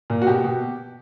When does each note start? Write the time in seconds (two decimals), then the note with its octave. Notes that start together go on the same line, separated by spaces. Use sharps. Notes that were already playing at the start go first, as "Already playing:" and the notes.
0.10 A#2
0.22 F#4
0.27 B2 G4
0.44 B2